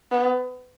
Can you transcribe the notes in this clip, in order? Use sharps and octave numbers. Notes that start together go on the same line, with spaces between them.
B3